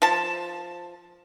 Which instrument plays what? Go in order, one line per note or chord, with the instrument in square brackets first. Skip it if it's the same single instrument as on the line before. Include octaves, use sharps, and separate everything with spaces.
[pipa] F3 A5